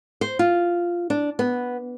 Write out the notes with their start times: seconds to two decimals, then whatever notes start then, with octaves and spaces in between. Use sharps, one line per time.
0.21 C5
0.39 F4
1.10 D4
1.39 B3